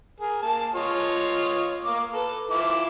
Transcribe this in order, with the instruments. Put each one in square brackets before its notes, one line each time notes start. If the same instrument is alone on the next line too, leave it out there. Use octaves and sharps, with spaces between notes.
[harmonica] G#4 A#4
A#3 A5
F4 C#5 D#5
A#3 D6
A4 B4
E4 F4 D6